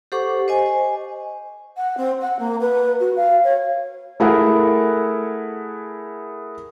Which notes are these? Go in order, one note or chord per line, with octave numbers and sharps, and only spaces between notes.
G4 A4 C5 F#5 C#6 D6
C5 D#5 G#5
F#5
C4
F#5
A#3
B4
F#4
F5
C#5
A3 E4 G#4 A#4 F#5